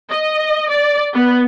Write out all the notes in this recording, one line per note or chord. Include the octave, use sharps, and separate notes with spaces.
D#5
D5
B3